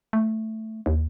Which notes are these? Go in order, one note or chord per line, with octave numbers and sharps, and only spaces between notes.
A3
D#2